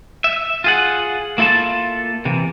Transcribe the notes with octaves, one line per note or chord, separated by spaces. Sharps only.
E5
F4 G#4 F#5
A#3 E4 F4 A4 A5
C3 E3